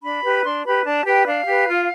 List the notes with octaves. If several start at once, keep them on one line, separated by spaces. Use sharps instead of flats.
D4 B5
G4 B4
D4 C6
G4 B4 B5
D4 A5
G4 B4 G5
D4 F5
G4 B4
F4